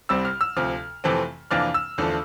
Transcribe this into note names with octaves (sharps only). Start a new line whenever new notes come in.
C2 C3 G3 C4 E6
F6
E6
D2 C3 F3 F6
F2 C3 E3 A3 C4
F2 C3 E3 A#3 D4 F6
E6
E2 D3 F3 A3